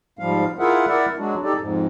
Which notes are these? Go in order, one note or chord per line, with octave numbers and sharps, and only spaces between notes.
G#2 F3 G3 F5
E4 F4 G#4 A#4 E5 F#5
E4 A#4 D5 E5 F#5
F#3 G#3 D4 F#4
D#4 G4 A4 D5
F2 G#2